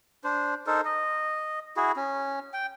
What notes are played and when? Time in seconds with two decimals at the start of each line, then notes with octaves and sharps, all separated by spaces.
0.24 D4 C5
0.67 D#4 A4 A#4 C5
0.85 D#5
1.77 E4 F#4 G#4
1.96 C#4
2.54 G5